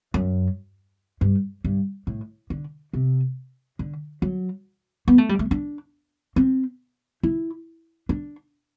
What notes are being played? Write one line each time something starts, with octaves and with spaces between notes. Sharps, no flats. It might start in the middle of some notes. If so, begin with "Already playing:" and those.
F#2
G2
G2
A2
D3
C3
D3
F#3
B3
A3
G3
A3
D4
C4
E4
D4